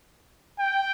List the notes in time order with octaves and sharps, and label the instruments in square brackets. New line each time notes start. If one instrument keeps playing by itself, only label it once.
[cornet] G5